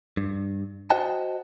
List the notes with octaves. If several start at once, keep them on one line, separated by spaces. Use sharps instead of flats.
G2
F#4 C5 D#5 F#5 G5 A5